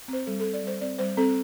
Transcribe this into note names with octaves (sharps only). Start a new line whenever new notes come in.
C4 C5
G3 A4
A4
C4
D5
G3 C5
C4 D5
G3 C5
C4 A4